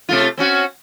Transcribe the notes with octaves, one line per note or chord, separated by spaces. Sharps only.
C3 A3 F4
C4 C#4 F#4